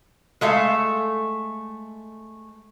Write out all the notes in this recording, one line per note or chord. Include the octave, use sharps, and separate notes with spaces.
G#3 A3 E5 F5